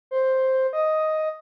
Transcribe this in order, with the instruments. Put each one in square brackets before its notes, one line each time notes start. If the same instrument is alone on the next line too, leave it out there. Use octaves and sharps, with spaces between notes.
[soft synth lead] C5
D#5